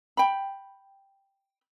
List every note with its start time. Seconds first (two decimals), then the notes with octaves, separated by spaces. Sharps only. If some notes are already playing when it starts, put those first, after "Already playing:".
0.17 G5 B5